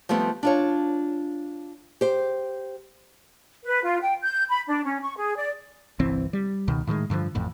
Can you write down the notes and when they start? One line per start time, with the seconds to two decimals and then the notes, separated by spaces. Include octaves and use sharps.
0.09 F3 G3 A3 B3 C4
0.43 D4 F4 C#5
2.01 G4 C5
3.65 B4
3.83 F4
4.01 G5
4.23 G6
4.49 B5
4.68 D4
4.84 C#4
5.02 C#6
5.17 G#4
5.36 D5
6.00 G1 C2 E3 C4
6.33 G3
6.68 C#2 B2 D#3
6.87 A2 D#3 E3 G#3
7.10 G2 D3 D#3 F3
7.35 A1 F2 A2